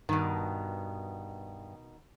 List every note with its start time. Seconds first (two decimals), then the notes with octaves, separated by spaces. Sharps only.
0.09 G2 B2 D#3